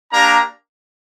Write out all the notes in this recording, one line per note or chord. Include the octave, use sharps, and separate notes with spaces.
A#3 D4 G4 A#5